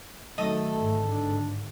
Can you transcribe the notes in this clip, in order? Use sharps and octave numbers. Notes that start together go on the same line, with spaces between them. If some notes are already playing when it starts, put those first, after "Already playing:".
D#3 F#3 A3 C4 A4 D#5 D#6
G#1 G#2 D3
D4